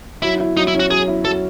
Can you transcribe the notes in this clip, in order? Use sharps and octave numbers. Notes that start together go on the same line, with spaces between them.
F#3 E4
E4
F#3 D#4
E4
C#4
F#4
F#3 G#4
E4
F#3 A4